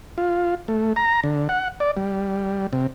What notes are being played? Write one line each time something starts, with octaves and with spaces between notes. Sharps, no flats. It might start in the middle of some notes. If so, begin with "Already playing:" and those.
F4
A3
A#5
D3
F#5
D5
G3
C3